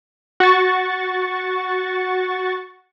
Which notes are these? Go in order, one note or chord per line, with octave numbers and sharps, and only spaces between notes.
F#4 C#6 A6